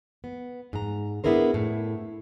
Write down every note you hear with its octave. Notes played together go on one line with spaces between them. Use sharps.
B3
G#2 A#5
B3 D4 E4 G#4 A#4 C5
A2